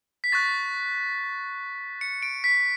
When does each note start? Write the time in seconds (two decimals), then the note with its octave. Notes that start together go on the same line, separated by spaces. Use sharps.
0.24 B6
0.32 C#6 F#6 A6
2.01 C#7
2.22 D7
2.44 B6